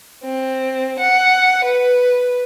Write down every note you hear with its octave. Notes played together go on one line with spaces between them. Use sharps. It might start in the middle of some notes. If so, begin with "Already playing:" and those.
C4
F#5
B4